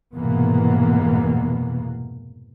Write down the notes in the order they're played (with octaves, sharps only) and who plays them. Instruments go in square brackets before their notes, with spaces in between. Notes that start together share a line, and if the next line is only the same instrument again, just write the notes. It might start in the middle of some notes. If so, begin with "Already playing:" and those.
[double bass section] F1 G#2 B2 E3 A#3 B3